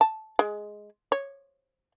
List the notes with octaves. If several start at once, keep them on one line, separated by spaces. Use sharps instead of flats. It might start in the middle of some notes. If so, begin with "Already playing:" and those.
A5
G#3
C#5